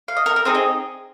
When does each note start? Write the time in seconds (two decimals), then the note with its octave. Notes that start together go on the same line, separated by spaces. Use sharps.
0.08 F5
0.17 D#5
0.26 A#4
0.36 A#4
0.45 C4 D#4 G#4 C5
0.55 D#5